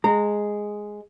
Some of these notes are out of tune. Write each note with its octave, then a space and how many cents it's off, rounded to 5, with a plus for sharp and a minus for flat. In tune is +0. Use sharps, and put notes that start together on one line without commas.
G#3 +0 A#5 -25